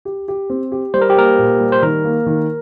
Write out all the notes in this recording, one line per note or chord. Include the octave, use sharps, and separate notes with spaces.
G4
G4
C4
G4
G3 C5
A#4
G4
A#3 A#4
A#2
G3
C5
D#3 A#4
A#3
D#3